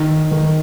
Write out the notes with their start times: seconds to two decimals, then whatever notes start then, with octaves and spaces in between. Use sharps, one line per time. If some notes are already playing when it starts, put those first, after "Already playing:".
Already playing: D#3
0.31 D#3